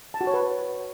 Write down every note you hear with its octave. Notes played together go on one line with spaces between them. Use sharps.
A5
F#4
C#5
B4